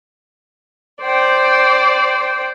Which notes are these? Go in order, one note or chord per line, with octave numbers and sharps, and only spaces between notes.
C5 D5 G5